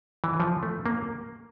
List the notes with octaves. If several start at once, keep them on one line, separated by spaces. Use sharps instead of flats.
E3
F3
A3
A#3